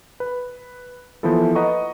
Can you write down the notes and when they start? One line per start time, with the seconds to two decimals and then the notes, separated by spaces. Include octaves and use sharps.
0.20 B4
1.23 E3 F3 A#3 B3 E4 A4
1.55 B4 D#5 F#5 A#5 C#6